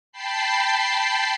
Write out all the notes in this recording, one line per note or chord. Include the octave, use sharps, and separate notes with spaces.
G5 A5 B5 C7